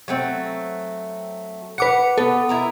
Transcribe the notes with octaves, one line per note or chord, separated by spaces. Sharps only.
F#3 A3 C4
B4 F#5 D6 C#7
B3 A4
E4 A#4 A#5